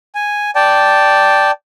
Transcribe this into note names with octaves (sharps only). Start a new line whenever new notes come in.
G#5
D5 G5 A5